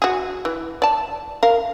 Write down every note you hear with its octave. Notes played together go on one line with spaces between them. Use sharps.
F#4 G#4
E3
D5 A5
A#4 F5